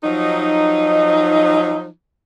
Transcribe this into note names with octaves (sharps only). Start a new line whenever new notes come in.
F3 F#3 D#4